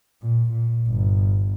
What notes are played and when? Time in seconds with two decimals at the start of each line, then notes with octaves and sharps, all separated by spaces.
0.22 A#2
0.52 A#2
0.87 G1